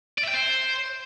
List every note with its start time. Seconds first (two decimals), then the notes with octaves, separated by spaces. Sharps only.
0.18 D5
0.23 E5
0.29 G5
0.34 C5